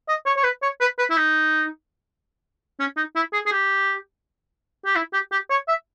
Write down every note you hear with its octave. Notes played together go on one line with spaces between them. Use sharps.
D#5
C#5
C#5
B4
C#5
B4
B4
E4
D#4
C#4
D#4
E4
G#4
G#4
G4
G4
E4
G4
G4
C#5
E5